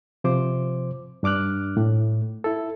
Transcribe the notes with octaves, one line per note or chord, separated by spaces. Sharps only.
C3 F3 C5 D6
G2 D4 D6 F6 F#6
A2
E4 A4